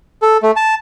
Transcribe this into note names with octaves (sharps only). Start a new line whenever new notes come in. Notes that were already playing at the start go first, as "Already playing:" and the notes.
A4
A3
A5